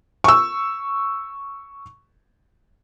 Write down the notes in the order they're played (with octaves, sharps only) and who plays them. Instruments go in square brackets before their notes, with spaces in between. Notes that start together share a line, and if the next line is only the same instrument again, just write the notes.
[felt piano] C#6 E6